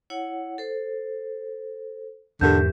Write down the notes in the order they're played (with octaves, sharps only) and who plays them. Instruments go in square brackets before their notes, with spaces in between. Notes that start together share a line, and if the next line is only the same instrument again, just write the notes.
[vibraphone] E4 C#5 F#5
A4 C5
[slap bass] E2 G#2 [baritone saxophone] D3 [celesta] G4 A#4 G6 [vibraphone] E5